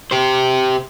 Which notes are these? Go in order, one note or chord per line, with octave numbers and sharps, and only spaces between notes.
G4 C5